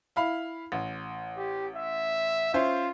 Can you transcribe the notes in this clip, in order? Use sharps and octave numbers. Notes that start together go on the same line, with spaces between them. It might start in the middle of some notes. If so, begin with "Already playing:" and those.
E4 F5 B5
A1
G4
E5
C#4 F4 C5 E5